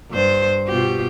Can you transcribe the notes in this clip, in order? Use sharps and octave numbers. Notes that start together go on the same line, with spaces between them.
G2 C5
B2 F4 G4